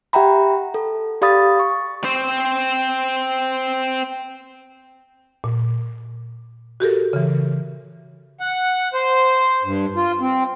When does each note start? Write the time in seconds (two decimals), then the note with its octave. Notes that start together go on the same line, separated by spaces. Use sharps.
0.13 G4 E5 F#5 G5 A#5 B5
0.74 A4
1.22 G4 D5 F5 B5 D#6 A6
1.59 C#6
2.04 C4 C5
5.44 A#2
6.80 F#4 G4 A4 A#4
7.13 C#3 E3
8.40 F#5
8.93 C5
9.64 G2
9.96 F4
10.21 C4